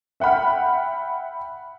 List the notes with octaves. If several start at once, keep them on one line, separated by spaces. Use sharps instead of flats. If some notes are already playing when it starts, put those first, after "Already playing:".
E5 F#5 G5 B5 F6